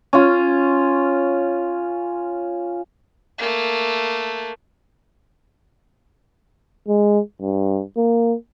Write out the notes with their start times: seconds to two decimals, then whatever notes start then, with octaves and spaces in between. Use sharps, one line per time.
0.13 C#4 F4
3.39 A3 A#3
6.88 G#3
7.41 G2
7.97 A#3